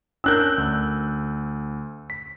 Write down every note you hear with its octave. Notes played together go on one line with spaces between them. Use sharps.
C#4 D4 A#4 E6 F#6 G6
D2
B6